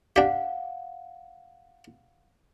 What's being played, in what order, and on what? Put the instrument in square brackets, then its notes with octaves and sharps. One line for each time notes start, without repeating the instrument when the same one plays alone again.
[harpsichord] D4 G4 [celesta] F5 F#5